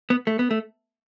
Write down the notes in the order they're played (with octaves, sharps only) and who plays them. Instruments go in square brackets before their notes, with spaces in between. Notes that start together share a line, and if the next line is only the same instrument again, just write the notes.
[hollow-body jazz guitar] B3
A3
B3
A3